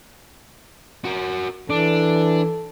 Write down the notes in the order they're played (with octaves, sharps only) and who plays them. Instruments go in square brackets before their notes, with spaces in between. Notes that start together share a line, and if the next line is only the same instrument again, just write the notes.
[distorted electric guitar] F#4 A#4
[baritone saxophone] E3 [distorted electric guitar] D4 [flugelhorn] A4